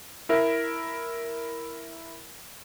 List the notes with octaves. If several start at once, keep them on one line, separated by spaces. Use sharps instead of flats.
E4 A#4 E5